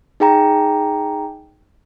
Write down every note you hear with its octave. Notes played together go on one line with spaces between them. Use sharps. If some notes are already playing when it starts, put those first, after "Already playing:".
D#4 G#4 G5 A#5